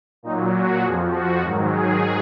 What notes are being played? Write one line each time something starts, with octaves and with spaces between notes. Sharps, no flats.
A#2 F#3 D#4
F#4
F2 F3 G#4
F#4
G#2 D#3 F#3
G#4